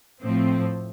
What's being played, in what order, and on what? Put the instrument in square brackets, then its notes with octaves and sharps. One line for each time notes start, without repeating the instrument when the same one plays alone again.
[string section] A2 F3 C4